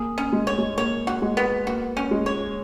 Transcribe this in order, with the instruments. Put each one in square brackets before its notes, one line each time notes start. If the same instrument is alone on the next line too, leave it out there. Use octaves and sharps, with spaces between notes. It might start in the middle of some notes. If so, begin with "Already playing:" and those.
Already playing: [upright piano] A#3 [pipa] G#4
[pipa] C#4
[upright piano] G#3
[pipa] C#5
[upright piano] G#3
[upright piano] A#3 [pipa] C#5
[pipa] F#4
[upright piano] G#3
[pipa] B3
[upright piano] A#3 [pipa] F#4
[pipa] C#4
[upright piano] G#3
[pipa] C#5